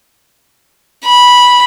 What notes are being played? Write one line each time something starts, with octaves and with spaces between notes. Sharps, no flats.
B5